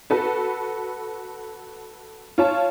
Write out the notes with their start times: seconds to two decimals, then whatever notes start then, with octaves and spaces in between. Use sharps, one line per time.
0.10 F#4 A4 B4
2.38 F4 C#5 A5